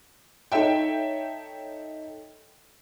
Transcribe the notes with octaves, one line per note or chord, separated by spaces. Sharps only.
D#4 A4 C#5 E5 G5